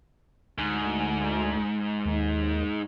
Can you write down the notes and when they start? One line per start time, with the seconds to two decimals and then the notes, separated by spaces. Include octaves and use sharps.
0.58 D2 G#2
2.05 D#2